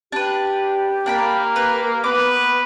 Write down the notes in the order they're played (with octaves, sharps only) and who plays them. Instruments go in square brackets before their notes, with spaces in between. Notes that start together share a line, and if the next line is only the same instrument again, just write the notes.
[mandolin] D4 B4 [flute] G4
[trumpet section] A#3 [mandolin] D4 G5 B5
[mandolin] B4
[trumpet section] B3 B4 [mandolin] D6